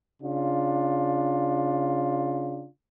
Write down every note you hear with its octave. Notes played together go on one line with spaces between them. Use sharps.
C#3 D4 F4